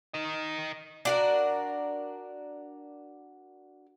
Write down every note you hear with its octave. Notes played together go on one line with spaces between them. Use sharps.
A#4 D#5
D4 F#4 A#4